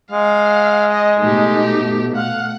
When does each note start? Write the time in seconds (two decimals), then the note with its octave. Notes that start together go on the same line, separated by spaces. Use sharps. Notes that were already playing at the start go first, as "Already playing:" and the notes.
0.11 G#3 F5
0.91 D#5
1.20 B2 A3 D#4 G4
2.16 F5 F#5